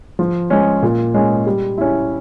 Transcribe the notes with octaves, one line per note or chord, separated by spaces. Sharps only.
F3
G#3 C#4
A#2
G#3 C#4
G3
C#4 E4